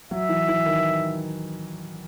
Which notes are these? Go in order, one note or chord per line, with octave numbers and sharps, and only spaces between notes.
F#3 E5
E3
E3
D#3